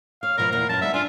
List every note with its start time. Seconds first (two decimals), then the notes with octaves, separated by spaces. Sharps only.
0.23 C#5 F5
0.38 B2 F3 A#4 B4
0.52 E2 A#2 A#3 A#4
0.69 F#2 B4 A5
0.81 G3 B3 D#4 E5
0.94 D4 F4 G#5